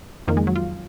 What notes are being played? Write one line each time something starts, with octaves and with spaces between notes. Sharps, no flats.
F2 D#3 A#3
G#3
F#3
F4